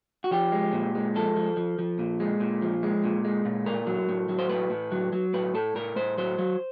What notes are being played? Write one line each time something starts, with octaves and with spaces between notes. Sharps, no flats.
F#4
F3 G4
G#3
A#2
G#3
F3 A4
F3
F3
F3
A#2
G#3
A#2
F3
G#3
A#2
G#3
A#2
A2 A#4
F#3
A2
F#3
C5
A2 B4
A2
F#3
F#3
A2 B4
A2 A4
A2 A#4
A2 C5
F#3 C5
F#3